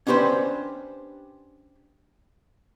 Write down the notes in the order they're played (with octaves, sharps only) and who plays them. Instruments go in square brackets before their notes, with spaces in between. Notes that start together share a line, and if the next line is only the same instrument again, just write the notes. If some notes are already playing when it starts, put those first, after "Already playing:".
[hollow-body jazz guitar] C#4 D4 G4 B4 C5